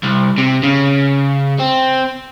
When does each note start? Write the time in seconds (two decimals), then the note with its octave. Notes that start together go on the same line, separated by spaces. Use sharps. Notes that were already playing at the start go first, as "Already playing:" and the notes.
0.03 C2
0.38 C3
0.63 C#3
1.60 C4